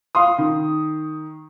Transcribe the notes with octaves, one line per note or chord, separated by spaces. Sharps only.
F5 C6 D#6
D#3